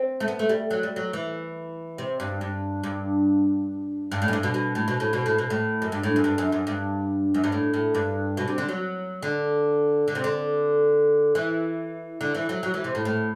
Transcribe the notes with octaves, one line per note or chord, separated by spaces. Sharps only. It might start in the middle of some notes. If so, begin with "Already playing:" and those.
Already playing: C4
A3
B3
A3
G3
F#3
G3
F#3
E3
C3
G2
G2
G2
G2
A2
F#2
G2
B2
B2
A2
B2
A2
B2
A2
B2
A2
F#2
G2
A2
F#2
G2
F#2
F#2
G2
F#2
G2
A2
A2
G2
B2
C3
D3
F#3
D3
D3
C3
D3
E3
D3
E3
F#3
F#3
E3
C3
A2
A2